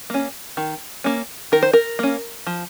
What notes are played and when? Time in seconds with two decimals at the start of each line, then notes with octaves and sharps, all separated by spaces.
0.10 A#3 C#4
0.57 D#3
1.04 A#3 C#4
1.52 D#3 A#4
1.63 C5
1.73 A#4
1.99 A#3 C#4
2.47 F3